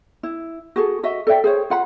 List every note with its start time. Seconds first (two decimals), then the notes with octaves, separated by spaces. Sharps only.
0.23 E4
0.76 F#4 G#4 A4
1.03 F#4 D#5 E5
1.27 A4 D5 E5 G5
1.44 G#4 C5 C#5
1.70 F4 F#5 B5